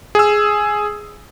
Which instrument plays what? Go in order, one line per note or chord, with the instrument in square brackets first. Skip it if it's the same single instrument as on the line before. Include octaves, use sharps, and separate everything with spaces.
[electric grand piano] G#4 E6